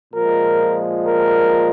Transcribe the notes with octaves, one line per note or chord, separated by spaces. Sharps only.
A#2 F3 G#3 A#4
A#4